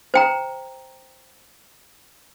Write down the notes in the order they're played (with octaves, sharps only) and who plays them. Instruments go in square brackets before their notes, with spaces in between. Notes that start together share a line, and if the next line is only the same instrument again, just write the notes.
[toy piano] C5 G5 A#5